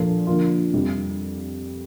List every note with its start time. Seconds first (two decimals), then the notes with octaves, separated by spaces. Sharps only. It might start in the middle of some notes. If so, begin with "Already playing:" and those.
Already playing: A#2 F3 A#3 D4 A4
0.27 D3 F3 A#3 F4
0.73 F2 C3 G3